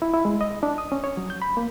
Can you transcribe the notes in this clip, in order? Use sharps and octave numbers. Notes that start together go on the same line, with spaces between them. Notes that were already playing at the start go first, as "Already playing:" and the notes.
E4
E4
G#3
D#5
D4
D#6
C#4
C#5
F#3
G6
B5
A#3